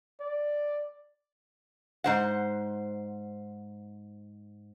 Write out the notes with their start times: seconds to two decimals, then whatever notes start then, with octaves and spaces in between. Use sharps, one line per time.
0.20 D5
2.04 G#2 C5 F#5